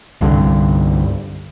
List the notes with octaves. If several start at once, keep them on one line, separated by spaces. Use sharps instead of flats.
C2 G2 D3